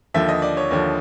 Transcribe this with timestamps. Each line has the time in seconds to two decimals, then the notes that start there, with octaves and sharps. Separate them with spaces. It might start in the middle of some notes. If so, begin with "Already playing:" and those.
0.14 D#2 D3 F3 E5
0.28 D#5
0.42 D5
0.57 C#5
0.70 D#2 D3 F3 C#5